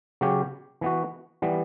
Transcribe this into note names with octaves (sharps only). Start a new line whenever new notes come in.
C#3 F#3 C#4 G4
E3 B3 F#4
E3 G3 B3